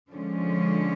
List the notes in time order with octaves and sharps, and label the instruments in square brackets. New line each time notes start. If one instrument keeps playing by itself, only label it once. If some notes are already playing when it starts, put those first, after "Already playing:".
[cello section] D3 F3 G#3 C#4